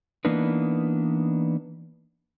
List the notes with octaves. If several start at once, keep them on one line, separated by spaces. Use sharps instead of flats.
E3 A#3 B3 D4 D#4 B4